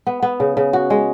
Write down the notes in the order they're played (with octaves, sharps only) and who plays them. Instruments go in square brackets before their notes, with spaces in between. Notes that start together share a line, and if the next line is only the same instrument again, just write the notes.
[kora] B3
B3
C#3
C#3
F#4
G#3